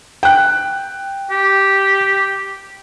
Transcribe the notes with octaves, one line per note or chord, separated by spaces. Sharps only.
G5 F#6
G4